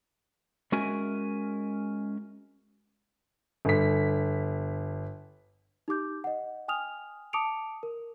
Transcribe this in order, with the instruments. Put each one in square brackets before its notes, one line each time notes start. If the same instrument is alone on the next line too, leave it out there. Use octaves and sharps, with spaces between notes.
[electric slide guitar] G#3 C#4 F#4 A#4 E5 G#5
[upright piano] G1 B6
[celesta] D#4 G4 D6 G6
D#5 F#5
G5 G#5 D#6 F6 F7
A5 D6 D#6 C#7 D7 F7
A#4